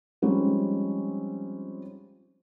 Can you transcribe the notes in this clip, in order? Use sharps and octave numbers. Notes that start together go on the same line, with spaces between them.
F3 G3 G#3 C4 C#4 D#4